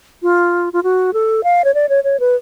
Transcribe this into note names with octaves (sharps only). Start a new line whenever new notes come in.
F4
F4
F#4
A4
F5
C#5
D5
C#5
C#5
B4